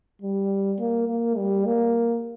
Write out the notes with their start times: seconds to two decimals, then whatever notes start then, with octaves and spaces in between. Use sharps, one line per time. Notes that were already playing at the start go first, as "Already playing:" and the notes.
0.22 G3
0.79 A#3
1.08 A#3
1.37 G3
1.66 A#3